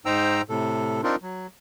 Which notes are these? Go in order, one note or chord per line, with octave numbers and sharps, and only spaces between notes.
G#2 D#4 C5 G5 A#5 E6
A2 C3 A4
C4 D4 D#4 F4 A#4
F#3